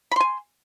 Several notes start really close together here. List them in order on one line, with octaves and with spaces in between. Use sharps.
B5 C6 G#5